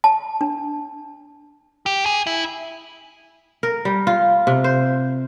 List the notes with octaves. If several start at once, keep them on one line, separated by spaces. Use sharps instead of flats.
A5
D4
G4
G#4
E4
A#4
G3
F4
C3
C5